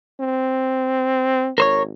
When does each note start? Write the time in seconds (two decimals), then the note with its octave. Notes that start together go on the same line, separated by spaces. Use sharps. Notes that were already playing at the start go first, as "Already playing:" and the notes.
0.20 C4
1.58 G#1 A#4 C5 C#5